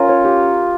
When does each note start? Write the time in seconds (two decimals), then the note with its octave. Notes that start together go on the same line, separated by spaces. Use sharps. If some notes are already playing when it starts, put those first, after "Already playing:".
Already playing: C#4 F4 A#4
0.09 C#5
0.24 G4